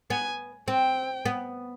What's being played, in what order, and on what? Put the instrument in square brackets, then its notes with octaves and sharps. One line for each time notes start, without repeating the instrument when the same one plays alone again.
[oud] B3 [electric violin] G#5
[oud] C4 [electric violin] G5
[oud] B3